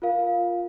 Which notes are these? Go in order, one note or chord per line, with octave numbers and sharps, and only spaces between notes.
F4 A#4 F5